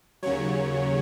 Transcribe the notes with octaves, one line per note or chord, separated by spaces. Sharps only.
D#2 C#3 F#3 C#5